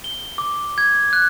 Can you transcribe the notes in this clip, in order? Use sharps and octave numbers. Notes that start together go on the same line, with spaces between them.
G7
D6
G#6
F#6